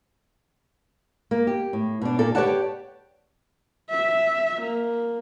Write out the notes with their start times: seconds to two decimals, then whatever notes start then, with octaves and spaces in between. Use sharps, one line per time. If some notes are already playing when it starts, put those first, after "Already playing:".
1.31 A#3
1.47 G4
1.73 A2
2.02 B2 D4
2.19 A#2 A#3 A4 D5
2.35 G4 B4 C#5 D5 F#5 A5
3.90 E5
4.62 A#3